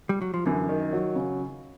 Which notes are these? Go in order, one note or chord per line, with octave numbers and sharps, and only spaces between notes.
G3
F#3
F3
F#2 D3 E3
D#3
F#3
C#3